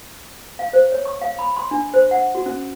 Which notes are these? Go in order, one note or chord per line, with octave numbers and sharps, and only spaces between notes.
F5
C5
C#5
C#6
F5
B5
C6
D4
C5
F#5
F#4
C#4